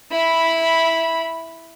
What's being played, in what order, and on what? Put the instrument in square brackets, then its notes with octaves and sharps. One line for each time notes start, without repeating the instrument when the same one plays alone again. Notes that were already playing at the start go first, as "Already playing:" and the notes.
[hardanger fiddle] E4 B5